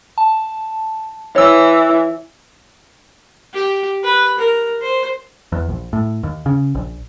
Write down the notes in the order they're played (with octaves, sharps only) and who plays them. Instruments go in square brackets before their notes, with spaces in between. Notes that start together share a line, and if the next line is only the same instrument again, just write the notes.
[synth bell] A5
[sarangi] E3 [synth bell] C#5 E6
[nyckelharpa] G4
B4
A#4
C5
[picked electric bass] E2
A#1
A2
D#2
C#3
A#1